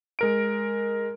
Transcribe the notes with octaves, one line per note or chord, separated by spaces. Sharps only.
G#3 A#4 D7